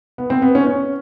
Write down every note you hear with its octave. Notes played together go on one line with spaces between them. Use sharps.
B3
C4
B3
C#4
C#4